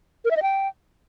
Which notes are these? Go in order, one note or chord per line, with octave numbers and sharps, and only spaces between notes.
A#4
E5
D#5
G5